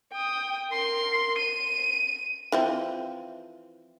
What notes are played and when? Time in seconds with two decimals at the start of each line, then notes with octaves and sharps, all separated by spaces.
0.13 G5 D#6
0.70 A#4 C6
1.39 D#7
2.52 E3 F3 C4